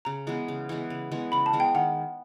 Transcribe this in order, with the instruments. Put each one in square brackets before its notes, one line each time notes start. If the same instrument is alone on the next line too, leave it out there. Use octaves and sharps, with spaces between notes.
[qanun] C#3 [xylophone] A#5
[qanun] E3 G#3 B3
C#3
E3 G#3 B3
C#3
E3 G#3 B3
[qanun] C#3 [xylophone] B5
[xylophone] A5
[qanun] E3 G#3 B3
[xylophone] G5
[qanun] D#3 [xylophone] F#5